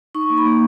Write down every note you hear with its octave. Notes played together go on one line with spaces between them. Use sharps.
D#4 C#6
A#3
B5
A#3